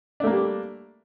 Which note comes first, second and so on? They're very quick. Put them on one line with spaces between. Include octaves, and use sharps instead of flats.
D4 A3 A#3 G3